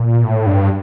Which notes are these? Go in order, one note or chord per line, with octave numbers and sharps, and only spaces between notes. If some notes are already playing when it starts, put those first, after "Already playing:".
Already playing: A#2
A2
G2